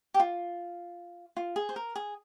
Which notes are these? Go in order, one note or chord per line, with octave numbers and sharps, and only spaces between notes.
G4
F4
F4
G#4
C5
A#4
G#4